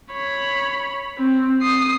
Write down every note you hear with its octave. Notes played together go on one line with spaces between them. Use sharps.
C#5 B5
C4
D#6 C7